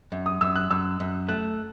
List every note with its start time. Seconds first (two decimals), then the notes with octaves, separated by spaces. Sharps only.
0.12 F#2
0.26 D#6
0.41 F#2 E6
0.56 F#6
0.70 F#2 E6
1.00 F#2
1.28 A3 F#6